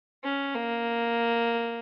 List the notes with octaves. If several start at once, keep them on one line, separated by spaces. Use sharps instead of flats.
C#4
A#3